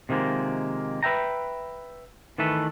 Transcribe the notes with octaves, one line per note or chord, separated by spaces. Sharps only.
C3 D#3 F3 G#3 A#3
B4 E5 G5 A#5
D#3 E3 A3 A4 B4